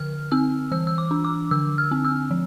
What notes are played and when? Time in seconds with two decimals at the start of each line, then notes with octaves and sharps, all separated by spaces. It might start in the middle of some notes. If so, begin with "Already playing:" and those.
Already playing: D3 F6
0.32 C4 E6
0.72 E3 E6
0.87 E6
0.98 D6
1.11 D4
1.24 D6
1.51 D3 E6
1.78 F6
1.91 C4
2.05 E6
2.31 F3